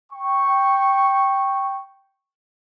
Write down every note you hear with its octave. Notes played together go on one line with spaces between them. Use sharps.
G5 C#6